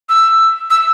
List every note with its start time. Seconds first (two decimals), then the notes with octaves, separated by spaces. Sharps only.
0.09 E6
0.70 E6